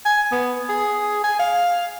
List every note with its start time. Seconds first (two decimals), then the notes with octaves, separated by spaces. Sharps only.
0.05 G#5
0.32 B3
0.69 G#4
1.24 G#5
1.40 F5